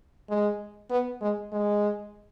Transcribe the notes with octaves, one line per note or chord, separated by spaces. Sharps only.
G#3
B3
G#3
G#3